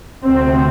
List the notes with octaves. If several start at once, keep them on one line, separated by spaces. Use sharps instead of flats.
D2 C3 C4